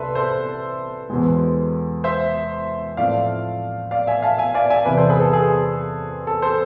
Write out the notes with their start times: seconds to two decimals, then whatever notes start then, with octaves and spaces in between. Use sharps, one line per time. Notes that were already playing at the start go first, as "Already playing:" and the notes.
Already playing: C2 C3 D4 A4 B4 C5 E5
0.15 A4 C5
1.10 E2 B2 G#3
2.04 C5 E5
2.97 A2 F3 A3 C4 D5 F5
3.91 D5 F5
4.07 E5 G#5
4.22 F5 A5
4.38 E5 G#5
4.54 D5 F5
4.70 E5 G#5
4.85 E2 C3 E3 B4 D5
4.97 A4 C5
5.09 G#4 B4
5.21 A4
5.33 G#4
6.27 A4
6.42 A4 C5